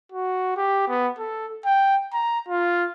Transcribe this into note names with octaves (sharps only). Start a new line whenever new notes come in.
F#4
G4
B3
A4
G5
A#5
F4